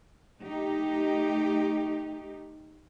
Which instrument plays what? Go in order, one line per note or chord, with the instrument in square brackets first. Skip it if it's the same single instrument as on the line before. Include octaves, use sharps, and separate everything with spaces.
[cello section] A3 D#4 G4